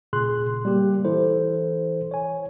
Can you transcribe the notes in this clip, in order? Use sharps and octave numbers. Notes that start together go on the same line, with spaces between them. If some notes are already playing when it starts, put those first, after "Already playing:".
A#2 C#3 G#4 C6 F#6
G3 A#3 G4
E3 E4 A4 C5
C#5 G#5